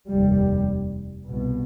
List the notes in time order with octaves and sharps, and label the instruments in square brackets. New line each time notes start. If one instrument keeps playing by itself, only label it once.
[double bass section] F1 D#2 G3
C2 B2